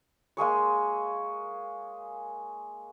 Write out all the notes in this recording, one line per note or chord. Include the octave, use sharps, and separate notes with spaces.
G#3 A#3 G#4 C#5